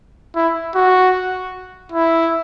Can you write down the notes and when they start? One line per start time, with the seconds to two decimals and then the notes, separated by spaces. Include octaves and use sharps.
0.36 E4
0.75 F#4
1.92 E4